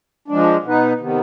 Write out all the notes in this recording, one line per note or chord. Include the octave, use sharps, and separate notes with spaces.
F3 G#3 D4
B2 B3 D#4 B4
C3 D#3 B3